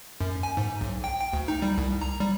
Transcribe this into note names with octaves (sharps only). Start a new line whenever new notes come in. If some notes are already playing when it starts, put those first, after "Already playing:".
F#2
G#5
G#2
B1
G5
G5
D2
D#4
G3
C2
A#5
G3